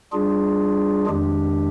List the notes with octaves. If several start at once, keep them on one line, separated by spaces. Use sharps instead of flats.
G3 D4 F4 G#4
F2 D#3 G#3 D4 G4